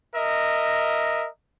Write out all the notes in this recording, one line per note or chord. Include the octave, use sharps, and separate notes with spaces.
A#4 D#5 E5